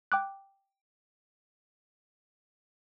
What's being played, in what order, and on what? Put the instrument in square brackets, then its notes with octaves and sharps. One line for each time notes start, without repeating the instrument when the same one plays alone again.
[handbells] G5 D6 F#6